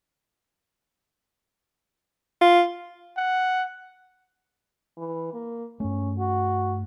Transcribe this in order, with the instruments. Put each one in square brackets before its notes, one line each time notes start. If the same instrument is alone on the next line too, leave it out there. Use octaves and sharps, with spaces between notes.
[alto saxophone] F4
[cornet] F#5
[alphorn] E3
A#3
[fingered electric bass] G2 A3 [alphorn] C#4
[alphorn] F#4